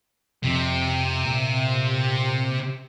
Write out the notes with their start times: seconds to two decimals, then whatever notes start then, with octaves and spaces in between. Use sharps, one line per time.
0.44 F2 C3 F3
1.26 A#2